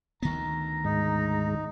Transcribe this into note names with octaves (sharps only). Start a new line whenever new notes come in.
D2 D#3 B3 A#5
G#2 D#4